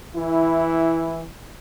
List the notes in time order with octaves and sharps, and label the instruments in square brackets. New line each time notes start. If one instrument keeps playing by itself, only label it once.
[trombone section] E3 E4